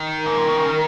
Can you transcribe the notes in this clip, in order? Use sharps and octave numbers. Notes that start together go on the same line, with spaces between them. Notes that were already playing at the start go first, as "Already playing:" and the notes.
Already playing: D#3
G#2 A#4
A#2
B2
C#3
D#3